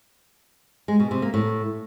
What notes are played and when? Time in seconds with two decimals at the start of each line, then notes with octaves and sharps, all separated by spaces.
0.88 G#3
1.00 B2
1.11 C3
1.22 A#3
1.34 A2